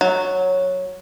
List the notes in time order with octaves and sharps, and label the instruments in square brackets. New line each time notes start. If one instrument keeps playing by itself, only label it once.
[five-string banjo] F#3